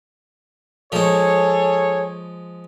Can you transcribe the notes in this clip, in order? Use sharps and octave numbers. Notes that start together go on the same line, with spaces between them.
F3 G#3 G#4 A4 C#5